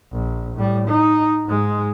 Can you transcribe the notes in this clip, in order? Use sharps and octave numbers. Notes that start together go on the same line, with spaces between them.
A#1
A2 G3
D#4
G#2 G#3